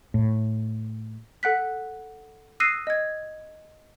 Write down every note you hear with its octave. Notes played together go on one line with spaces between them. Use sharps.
A2
A4 F#5 F#6 B6
D#6 E6 F#6 A#6 C7 D#7
D#5 G#6